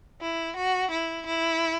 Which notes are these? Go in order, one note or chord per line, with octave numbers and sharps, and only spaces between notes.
E4
F#4
E4
E4